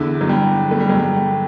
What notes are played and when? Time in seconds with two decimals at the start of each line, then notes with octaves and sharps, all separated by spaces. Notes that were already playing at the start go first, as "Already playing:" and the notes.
Already playing: E2 D3 E4
0.21 F#3
0.29 G3
0.71 A3
0.80 G3
0.89 F#3
0.98 G3